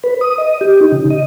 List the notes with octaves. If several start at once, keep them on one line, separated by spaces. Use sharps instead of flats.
B4
D#6
D#5
G4
D#4
C#3
D#5